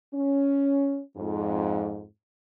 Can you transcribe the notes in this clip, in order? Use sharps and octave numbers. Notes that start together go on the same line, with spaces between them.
C#4
F2 G#2